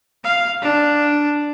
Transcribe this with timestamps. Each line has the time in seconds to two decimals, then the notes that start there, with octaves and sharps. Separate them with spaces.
0.24 F5
0.62 D4